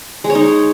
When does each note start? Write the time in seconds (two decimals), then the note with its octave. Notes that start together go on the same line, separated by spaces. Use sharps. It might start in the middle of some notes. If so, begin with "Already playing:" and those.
0.24 G#3
0.30 C#5
0.35 D#4